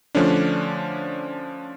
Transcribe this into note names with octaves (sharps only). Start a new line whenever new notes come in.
D3 F3 A3 C#4 D4